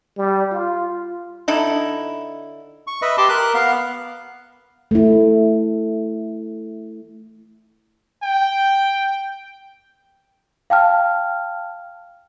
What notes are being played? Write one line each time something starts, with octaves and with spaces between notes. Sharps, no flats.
G3
F4
D3 D#4 E4
C#6
B4 D#5 E5
G4 A5 C6 D6
A#4 F#6
B3 F5
A3 E4
G5
F5 G5 A5 F6